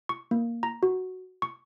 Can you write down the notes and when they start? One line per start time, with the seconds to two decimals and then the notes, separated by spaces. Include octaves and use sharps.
0.09 C#6
0.31 A#3
0.63 A#5
0.83 F#4
1.42 C#6